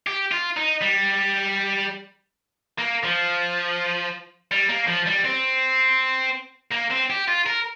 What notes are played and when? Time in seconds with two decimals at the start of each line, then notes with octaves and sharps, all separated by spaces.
0.07 G4
0.32 F4
0.57 D#4
0.81 G3
2.78 A#3
3.03 F3
4.52 G3
4.69 A#3
4.88 F3
5.06 G3
5.25 C4
6.72 A#3
6.91 C4
7.10 G4
7.28 F4
7.46 A#4